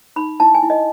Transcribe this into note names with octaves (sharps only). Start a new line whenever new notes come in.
D#4 B5
E4 A5
G#5
E4
D#5